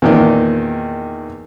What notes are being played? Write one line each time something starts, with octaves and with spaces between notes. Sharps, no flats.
E2 A#2 D#3